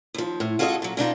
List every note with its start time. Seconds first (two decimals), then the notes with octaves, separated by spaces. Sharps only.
0.14 D#2 F3
0.40 A2
0.59 F4 F#4 G#4 A4 C5 D#5
0.82 A#2 F#3
0.97 B2 D4 D#4 F4